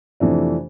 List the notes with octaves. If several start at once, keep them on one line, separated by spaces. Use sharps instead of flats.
F2 C3 E3 A3 D4